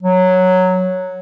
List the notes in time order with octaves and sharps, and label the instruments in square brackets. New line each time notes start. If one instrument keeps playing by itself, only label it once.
[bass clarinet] F#3